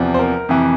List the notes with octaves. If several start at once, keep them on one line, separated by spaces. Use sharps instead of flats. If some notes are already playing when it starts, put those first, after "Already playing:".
Already playing: E2 C3 F3
C5
A#4
F2 C3 E3